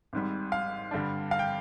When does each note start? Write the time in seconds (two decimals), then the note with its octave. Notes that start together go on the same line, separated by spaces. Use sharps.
0.13 G#1 G#2 G3
0.52 F5
0.91 G2 D3 G3 D4
1.31 F5
1.39 G5